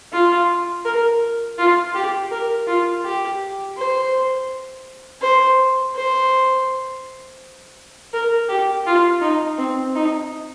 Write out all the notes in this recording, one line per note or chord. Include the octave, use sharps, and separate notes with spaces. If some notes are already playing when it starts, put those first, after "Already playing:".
F4
A#4
F4
G4
A#4
F4
G4
C5
C5
C5
A#4
G4
F4
D#4
C4
D#4